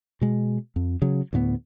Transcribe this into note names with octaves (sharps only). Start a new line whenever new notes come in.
B2 G#3
F2
C#3 F#3
D2 A2 A#3 B3